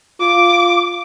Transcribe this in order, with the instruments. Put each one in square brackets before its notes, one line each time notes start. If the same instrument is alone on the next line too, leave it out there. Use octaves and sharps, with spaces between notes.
[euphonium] F4 [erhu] D6